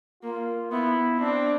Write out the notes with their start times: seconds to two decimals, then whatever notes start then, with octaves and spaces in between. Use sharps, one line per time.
0.23 A#3 F4
0.72 B3 E4
1.20 C4 D4